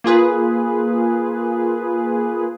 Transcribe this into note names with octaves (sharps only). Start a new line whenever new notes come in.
A#3 F4 G#4 B4